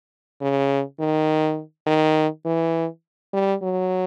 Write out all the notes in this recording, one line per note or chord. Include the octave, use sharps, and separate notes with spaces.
C#3
D#3
D#3
E3
G3
F#3